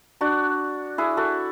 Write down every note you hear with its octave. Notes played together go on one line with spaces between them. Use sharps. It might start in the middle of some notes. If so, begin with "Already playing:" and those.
D4 F#4
E4 G#4
F#4 A4